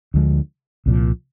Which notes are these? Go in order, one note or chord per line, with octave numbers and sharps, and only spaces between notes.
D2 D3 F3 G#3
C2 A#2 F3